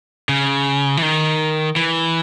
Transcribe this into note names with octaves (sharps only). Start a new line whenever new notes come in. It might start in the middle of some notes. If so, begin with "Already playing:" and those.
C#3
E3
D#3
E3